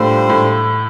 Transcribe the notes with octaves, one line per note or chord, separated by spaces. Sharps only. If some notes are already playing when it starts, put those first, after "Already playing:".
Already playing: A2 G3 A3 D4 F4 C5
A2 A3